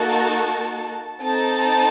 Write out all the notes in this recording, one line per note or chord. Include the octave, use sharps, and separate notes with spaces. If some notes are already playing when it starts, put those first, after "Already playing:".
Already playing: A#3 D#4 F#4 A4 A5
C4 D#4 A4 A5